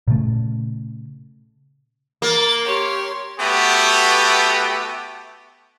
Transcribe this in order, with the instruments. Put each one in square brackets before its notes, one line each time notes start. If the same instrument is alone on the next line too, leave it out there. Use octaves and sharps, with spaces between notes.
[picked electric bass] A#2 C#3 A3
[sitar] A#3 [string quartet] A6
[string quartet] G4 C#5 C6
[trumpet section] A3 B3 F#4 G4